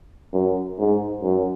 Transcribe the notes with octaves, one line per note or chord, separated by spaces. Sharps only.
F#2
G#2
F#2